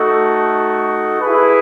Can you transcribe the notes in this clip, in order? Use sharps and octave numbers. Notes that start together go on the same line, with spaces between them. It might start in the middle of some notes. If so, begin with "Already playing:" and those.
Already playing: A3 D#4 F#4 A4
E4 G#4 B4